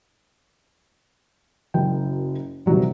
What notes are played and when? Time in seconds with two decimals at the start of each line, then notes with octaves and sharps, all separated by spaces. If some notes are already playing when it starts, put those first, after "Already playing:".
1.74 F#1 F#2 G5
2.66 C3 D#3 E3 F#3 G3